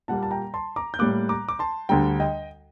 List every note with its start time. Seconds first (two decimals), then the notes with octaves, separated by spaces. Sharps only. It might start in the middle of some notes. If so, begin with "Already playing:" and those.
0.08 A#2 G3 A#3 F#5 A5
0.23 A5
0.31 G5 A#5
0.54 A5 C6
0.76 A#5 D6
0.94 G6
0.99 A2 G3 A#3 D6 F#6
1.29 A#5 D6
1.49 D6
1.59 A5 C6
1.89 D2 D3 G3 G5 A#5
2.20 D#5 G5